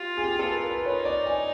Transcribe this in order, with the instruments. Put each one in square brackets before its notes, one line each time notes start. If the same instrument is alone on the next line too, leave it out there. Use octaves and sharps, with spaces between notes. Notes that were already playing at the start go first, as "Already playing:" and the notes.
Already playing: [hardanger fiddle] F4 [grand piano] G4
[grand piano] G#4
G4
A4
B4
A#4
B4
[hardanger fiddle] D#4 [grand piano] C#5
[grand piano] D5
G#5